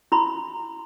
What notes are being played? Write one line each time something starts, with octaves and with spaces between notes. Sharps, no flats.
E4 B5 C6